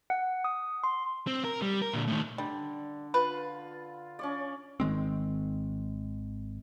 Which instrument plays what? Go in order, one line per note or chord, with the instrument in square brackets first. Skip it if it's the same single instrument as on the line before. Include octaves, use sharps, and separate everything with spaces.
[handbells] F#5
D#6
C6
[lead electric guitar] C4
A#4
G3
A#4
A#2 D3
A2 D#3
[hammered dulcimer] D3 [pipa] G3
[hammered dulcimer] F4 [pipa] B4
[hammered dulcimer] C#4 C#5 D5
[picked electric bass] G#1 D#3 G#3 C4